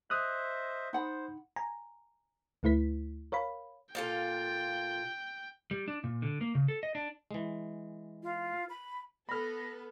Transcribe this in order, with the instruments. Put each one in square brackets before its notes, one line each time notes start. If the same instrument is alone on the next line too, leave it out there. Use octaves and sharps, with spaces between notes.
[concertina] C5 D#5 E5 [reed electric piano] D#6 F6 F#6
[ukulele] D#4 F#5 B5 [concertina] C5
[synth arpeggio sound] G#5 A#5
D2 A3 E4 B4 B6
A#4 C#5 F5 B5
[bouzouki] A#2 F4 A4 [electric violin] G5
[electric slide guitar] G3
D4
A#2
D3
A#3
C#3
A4
D#5
D4
[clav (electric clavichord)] E3 G#3
[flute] F4
B5
[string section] B3 A4 [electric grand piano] B5 F6 [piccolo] A#6